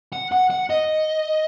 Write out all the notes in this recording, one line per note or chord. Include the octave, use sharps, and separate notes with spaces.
F#5
F#5
F#5
D#5